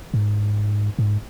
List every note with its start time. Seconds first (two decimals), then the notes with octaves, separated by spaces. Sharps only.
0.14 G#2
0.99 G#2